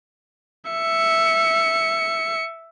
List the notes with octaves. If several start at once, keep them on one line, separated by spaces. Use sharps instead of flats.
E5 C#7